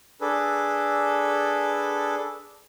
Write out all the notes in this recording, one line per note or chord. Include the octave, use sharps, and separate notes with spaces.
D4 G#4 A4 B4